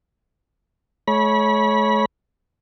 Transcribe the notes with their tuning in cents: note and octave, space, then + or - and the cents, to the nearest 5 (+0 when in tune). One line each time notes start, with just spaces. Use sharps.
A3 -45 C#5 +0 B5 -30